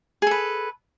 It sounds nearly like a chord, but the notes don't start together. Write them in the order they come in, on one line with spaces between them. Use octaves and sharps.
G#4 A4 B4